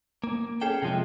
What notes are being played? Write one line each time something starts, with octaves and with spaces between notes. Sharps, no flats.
A#3
C#4 G#4 A4 G5
C3 F3 G#3